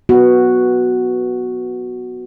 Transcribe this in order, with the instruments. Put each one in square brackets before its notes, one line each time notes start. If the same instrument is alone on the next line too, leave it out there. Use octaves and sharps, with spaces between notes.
[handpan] B3 F#4